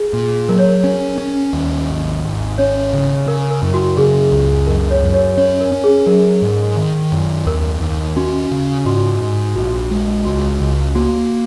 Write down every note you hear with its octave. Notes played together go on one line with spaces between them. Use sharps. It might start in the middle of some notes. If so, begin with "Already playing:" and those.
Already playing: G#4
A#2
F#3 A#4
C#5
A#4
C#4
C#4
D#2
G#1
G#1
C#4 C#5
C#3
C#3 A#4
A#4
F#2
F#4
C#3 G#4
C#2
F#2 A#4
C#5
F#2
C#5
C#4 C#5
A#4
C#4
G#4
F#3 A#4
G#2
D#3
F#2
D#2 A#4
D#2
C#4 F#4
C#3
G#2 F#4
G#2
A#1 F#4
G#3
C#2 F#4
C#2
A#3 F#4